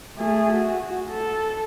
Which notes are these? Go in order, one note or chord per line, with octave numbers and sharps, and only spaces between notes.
A3 G#4
F#4
A4